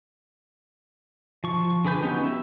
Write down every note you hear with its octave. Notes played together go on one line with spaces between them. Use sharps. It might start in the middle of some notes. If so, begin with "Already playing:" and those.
F3 C#6
D3 G#4 B4 G6
F#3 B3 C#4 D#4 G4
E5